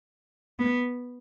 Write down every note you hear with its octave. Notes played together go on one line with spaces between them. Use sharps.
B3